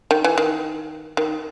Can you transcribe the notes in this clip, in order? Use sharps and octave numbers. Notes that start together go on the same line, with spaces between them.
D#3
E3
D#3
D#3